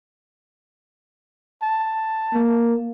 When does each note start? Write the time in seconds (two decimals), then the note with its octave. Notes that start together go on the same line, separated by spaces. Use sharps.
1.63 A5
2.34 A#3